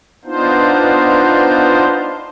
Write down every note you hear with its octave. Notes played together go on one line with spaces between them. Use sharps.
B3 D4 D#4 F4 C5